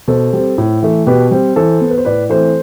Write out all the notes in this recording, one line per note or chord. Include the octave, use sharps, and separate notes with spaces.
B2 A4 C5
G3 C4
A2
E3 A3
B2 G4 B4
G3 C4
E3 A4 C5
B3
B4
C5
A2 B4 D5
E3 A3 C4 A4 C5